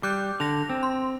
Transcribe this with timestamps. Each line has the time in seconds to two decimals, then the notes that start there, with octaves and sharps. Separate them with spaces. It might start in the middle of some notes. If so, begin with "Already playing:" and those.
0.03 G3 D6 F#6 G6
0.40 D3 A#6 F7
0.69 C4
0.83 C6